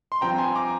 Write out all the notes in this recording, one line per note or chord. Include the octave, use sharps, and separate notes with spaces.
C6
G2 F3 C4 G5 A#5
G#5 C6
A#5 D6